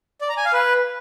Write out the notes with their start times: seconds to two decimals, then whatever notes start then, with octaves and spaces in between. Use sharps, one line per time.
0.21 D5
0.29 A#5
0.37 G#5
0.45 F5
0.53 B4